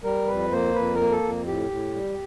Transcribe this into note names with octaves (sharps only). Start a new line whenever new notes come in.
G3 A#4
F2 B4
A#3 C5
F2 B4
A#4
A#3
A4
F2
A2 G4
A2
G3